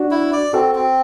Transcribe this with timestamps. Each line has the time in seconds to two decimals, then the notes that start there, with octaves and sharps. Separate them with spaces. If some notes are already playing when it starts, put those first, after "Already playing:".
Already playing: D4 F#4
0.11 E4
0.33 D5
0.53 C4 F#4 A4
0.75 C4